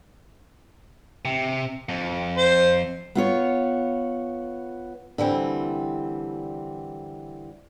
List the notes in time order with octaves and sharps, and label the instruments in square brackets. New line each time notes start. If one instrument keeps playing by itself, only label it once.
[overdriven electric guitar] C3
F2
[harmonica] C5
[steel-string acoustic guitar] B3 F4 C#5
D3 E3 G3 C4